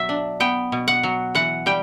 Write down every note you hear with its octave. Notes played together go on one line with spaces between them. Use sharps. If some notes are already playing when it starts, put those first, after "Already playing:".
Already playing: B2 F#3 E5
D4
B3 G5
B2
F#5
F#3
E3 F#5
G3 G5